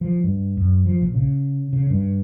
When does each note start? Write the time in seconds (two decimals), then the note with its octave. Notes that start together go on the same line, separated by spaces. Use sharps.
0.01 F3
0.24 G2
0.57 F#2
0.86 F3
1.02 A#1
1.14 C#3
1.73 C#3
1.90 G2